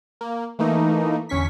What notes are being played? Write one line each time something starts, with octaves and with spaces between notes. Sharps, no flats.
A#3
E3 A3 A#3 D#4
G1 E2 C#4 C#6 B6